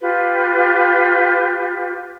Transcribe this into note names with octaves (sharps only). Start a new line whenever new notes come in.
F4 G4 B4